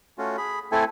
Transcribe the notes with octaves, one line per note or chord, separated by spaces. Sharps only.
A3 C#4 F4 F#4
G#4 B5
A3 C4 E4 A4 G#5